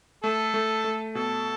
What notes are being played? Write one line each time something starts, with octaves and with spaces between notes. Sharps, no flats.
A3 A4
A3
A3
B2 A4